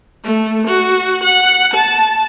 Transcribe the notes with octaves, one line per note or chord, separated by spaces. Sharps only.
A3
F#4
F#5
A5